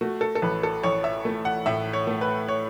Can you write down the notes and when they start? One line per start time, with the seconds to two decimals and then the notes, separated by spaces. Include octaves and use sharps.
0.01 A3 F#4
0.21 A4
0.35 A4
0.42 A1 B4
0.63 A4
0.83 A1 C#5
1.04 E5
1.25 A3
1.45 F#5
1.66 A2 E5
1.93 C#5
2.07 A3
2.21 B4
2.48 C#5